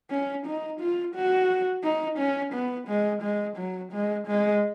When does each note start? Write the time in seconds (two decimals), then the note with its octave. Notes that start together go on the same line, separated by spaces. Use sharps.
0.10 C#4
0.46 D#4
0.80 F4
1.15 F#4
1.83 D#4
2.18 C#4
2.53 B3
2.88 G#3
3.22 G#3
3.57 F#3
3.92 G#3
4.27 G#3